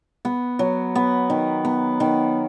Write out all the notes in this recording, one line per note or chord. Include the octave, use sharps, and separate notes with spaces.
B3
F#3
B3
D#3
B3
D#3